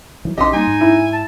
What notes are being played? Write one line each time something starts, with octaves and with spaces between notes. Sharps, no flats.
E3 F#3
A#1 C#4 G4 D#5 C6
G3 A#3 D#4 G#5
G#2
E4
A5